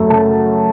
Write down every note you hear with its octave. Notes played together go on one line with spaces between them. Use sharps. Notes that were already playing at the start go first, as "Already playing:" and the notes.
Already playing: F#2 F#3 A3
C#3 A5